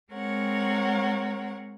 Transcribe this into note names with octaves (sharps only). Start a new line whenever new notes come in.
G#3 C4 A#4 C#5 F#5